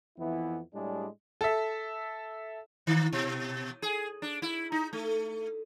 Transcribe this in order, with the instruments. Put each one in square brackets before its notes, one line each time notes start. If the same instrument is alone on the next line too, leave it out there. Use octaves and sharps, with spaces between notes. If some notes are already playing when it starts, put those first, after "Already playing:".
[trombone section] F2 E3 B3 E4
A2 G3 G#3 D4 G#4
[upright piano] A4 E5
[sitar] D#3
B2
G#4
D4
E4
D#4
A3